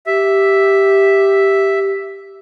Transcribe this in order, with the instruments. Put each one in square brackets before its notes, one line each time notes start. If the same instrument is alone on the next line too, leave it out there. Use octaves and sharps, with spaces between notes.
[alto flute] G4 [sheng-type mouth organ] E5